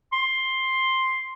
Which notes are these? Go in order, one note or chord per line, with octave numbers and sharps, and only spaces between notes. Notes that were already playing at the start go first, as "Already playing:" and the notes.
C6